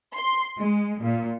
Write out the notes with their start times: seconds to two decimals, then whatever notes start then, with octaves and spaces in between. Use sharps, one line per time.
0.15 C6
0.59 G#3
1.03 A#2